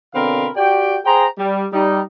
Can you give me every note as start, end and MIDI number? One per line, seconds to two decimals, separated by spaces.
0.14 0.48 47
0.14 0.48 50
0.14 0.48 60
0.14 0.48 70
0.14 0.48 77
0.14 0.48 83
0.56 0.97 66
0.56 0.97 67
0.56 0.97 74
0.56 0.97 79
1.06 1.26 68
1.06 1.26 72
1.06 1.26 79
1.06 1.26 82
1.38 1.65 55
1.73 2.01 55
1.73 2.01 63